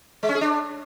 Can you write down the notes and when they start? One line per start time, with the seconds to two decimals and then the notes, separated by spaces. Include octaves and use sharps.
0.23 G#3
0.29 C#4
0.35 G#4
0.41 D4